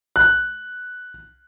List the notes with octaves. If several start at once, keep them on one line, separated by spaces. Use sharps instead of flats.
F#6